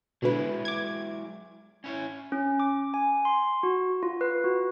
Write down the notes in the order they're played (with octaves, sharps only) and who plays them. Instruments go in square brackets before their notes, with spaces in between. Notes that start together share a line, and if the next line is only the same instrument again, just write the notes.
[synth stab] B2 D3 B4 [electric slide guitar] F#3 G#3 E4
[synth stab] D6 G#6
[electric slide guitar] C#4 E4 C#5
[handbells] C#4
D6
G#5
C6
F#4
F4
B4
F#4